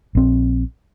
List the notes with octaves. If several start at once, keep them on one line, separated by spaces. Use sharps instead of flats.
A#1 C4